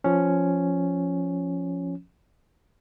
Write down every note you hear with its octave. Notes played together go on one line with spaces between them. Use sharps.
F3 C#4